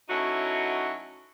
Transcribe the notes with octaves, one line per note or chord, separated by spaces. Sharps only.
F#3 A3 C#4 D#4 E4 F#4